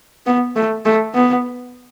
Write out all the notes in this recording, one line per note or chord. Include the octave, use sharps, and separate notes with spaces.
B3
A3
A3
B3